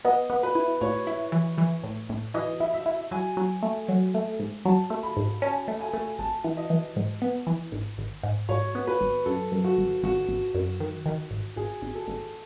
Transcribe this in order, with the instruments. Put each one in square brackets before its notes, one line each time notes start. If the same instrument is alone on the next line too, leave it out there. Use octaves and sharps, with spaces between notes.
[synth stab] B3 [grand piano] D#5
[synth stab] B3
[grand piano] B4
[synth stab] E4
[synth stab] A2 [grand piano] C#5
[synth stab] E4
E3
E3
A2
A2
[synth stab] E3 [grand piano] D#5
[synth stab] E4
[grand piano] E5
[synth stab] E4
[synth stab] F#3 [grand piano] G#5
[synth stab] F#3
A3
F#3
A3
G#2
[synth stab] F#3 [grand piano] A5
[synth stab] A3
[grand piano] B5
[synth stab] G#2
[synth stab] C#4 [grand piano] A5
[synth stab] A3
[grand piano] G#5
[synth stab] A3
[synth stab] G#1 [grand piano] A5
[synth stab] E3
[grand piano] D#5
[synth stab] E3
G#2
B3
E3
G#1
G#1
G#2
[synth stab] G#2 [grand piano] C#5
[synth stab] B3
[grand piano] B4
[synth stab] G#1
[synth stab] F#2 [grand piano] A4
[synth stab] F#2
[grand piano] F#4
[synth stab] G#1
[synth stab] G#1 [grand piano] F#4
[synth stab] G#1
F#2
D#3
D#3
G#1
[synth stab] G#1 [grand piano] G#4
[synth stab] G#1
[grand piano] A4
[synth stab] G#1